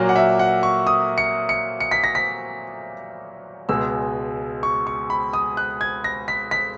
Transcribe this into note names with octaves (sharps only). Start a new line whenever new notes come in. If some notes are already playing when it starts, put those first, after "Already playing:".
Already playing: A#2 F#3 A#3
F#5
E5
F#5
C#6
D#6
C#7
C#7
C#7
B6
A#6
B6
C#2 B2 G#3 E6
C#6
C#6
B5
D#6
F#6
G#6
A#6
B6
B6